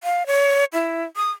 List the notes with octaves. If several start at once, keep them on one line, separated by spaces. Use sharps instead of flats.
F5
C#5
E4
D#6